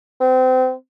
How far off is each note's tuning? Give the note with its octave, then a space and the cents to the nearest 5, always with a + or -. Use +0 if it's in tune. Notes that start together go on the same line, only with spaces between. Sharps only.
C4 -30